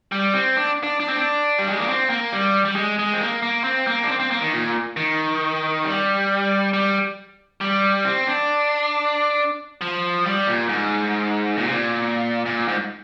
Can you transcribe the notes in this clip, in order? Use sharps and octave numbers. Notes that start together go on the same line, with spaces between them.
G3
C4
D4
D4
D4
C4
D4
G3
G#3
A#3
C4
A#3
G3
G3
G#3
G#3
C4
A#3
A#3
C4
A#3
D4
C4
C4
A#3
D#3
A#2
D#3
G3
G3
G3
C4
D4
F3
G3
A#2
G#2
A#2
C3
A#2
A#2
G#2